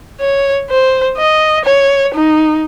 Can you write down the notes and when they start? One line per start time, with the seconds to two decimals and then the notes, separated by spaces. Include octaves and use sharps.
0.20 C#5
0.70 C5
1.17 D#5
1.65 C#5
2.15 D#4